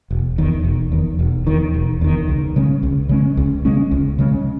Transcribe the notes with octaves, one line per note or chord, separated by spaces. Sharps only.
E1
E2 D#3
E1
E2 D#3
E1
E2 D#3
E1
E2 D#3
C#2
C#3 G#3 C#4
C#2
C#3 G#3 C#4
C#2
C#3 G#3 C#4
C#2
C#3 G#3 C#4